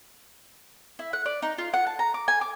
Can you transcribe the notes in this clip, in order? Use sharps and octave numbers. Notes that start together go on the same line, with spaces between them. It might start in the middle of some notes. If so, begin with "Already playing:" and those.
E4
F#5
D5
D#4
F4
F#5
A5
A#5
D6
G#5
D6